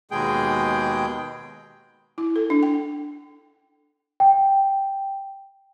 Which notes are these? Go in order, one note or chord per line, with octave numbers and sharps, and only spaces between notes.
D#2 B2 G#3 G#4 G5
E4
A4
D4
G5
G5